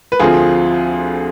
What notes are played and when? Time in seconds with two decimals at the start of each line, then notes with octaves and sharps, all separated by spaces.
0.12 B4
0.19 D2 D3 F3 C4 F4 G#4